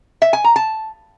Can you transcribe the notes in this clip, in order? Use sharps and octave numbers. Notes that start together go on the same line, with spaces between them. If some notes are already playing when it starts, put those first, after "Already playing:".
E5
G#5
A#5
A5